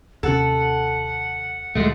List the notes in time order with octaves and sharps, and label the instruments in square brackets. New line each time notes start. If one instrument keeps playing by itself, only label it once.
[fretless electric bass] D#2 C3 C#4 [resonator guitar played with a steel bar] A4 [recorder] F#5
[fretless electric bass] D2 A#2 [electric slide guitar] G#3 A3